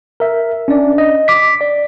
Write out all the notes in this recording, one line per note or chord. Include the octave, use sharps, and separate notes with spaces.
A#4 E5
C#4 D4 D5
D#5
D6 B6
D5